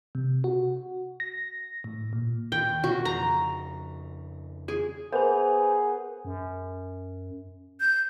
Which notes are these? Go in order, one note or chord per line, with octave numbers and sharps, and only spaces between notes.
C3
F#4
A#6
A2
A#2
D#2 G5
B2 D3 F#4
F2 C#3 A#5
G#4
B3 G#4 A#4 C5 G#5
F#2
G6